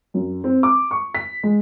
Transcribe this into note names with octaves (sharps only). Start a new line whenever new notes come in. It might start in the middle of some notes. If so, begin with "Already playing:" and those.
F#2
C4
D6
C#6
B6
G#3